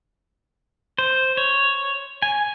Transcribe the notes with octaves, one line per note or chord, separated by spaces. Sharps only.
C5
C#5
G#5